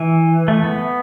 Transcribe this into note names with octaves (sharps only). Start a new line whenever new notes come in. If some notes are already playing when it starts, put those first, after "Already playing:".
Already playing: E3
A3
B3